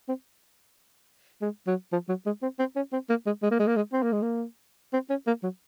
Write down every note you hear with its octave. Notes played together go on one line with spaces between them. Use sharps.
C4
G#3
F#3
F3
F#3
G#3
C4
C4
C#4
C4
A#3
G#3
G#3
A#3
G#3
A#3
G#3
C4
A#3
G#3
A#3
C4
C#4
A#3
F#3